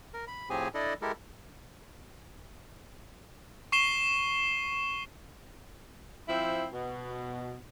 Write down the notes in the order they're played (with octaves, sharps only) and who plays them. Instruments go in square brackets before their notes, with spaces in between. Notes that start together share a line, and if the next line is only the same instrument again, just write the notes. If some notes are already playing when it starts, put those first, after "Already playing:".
[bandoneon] A#4
B5
A2 F3 C4 G4 G#4 G#5
D4 E4 A4 D5 D#5
G#3 E4 G4 A4 A#4
[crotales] C#6 C7 E7 G7
[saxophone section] F3 C4 E4
B2